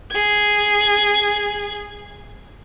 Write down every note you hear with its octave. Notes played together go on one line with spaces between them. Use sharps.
G#4 G#6